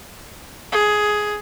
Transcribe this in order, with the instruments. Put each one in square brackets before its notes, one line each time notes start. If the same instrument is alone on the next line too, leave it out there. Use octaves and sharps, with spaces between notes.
[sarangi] G#4